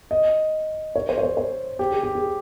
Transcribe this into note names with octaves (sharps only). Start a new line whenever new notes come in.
D#5
C#5
C5
C#5
C5
C5
G4
G#4
G4
G#4